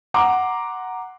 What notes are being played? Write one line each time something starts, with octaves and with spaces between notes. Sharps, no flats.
F#5 A#5 C6 D6